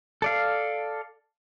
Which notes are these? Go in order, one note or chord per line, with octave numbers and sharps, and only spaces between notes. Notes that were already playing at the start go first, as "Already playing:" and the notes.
A4 D5 F5